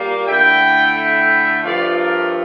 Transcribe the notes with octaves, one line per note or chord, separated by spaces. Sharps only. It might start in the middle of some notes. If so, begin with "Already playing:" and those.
Already playing: A#2 G3 A#3
D3 A3 E4 E5 G5
E5 G5
G2 F3 A3 D5 F5
A#4 D5